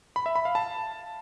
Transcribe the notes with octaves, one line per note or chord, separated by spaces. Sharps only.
B5
E5
B5
F5
A5